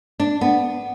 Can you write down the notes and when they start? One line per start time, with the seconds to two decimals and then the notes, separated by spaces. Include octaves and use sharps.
0.20 D4
0.41 B3